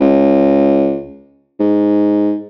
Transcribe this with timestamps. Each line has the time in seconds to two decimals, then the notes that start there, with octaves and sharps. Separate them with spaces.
0.01 C#2
1.60 G#2